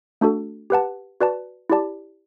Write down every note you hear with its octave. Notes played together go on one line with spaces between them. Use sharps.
A3 D4 F#4 A4
G4 B4 F#5 A5
F#4 B4 D5 A5
E4 G4 D5 A5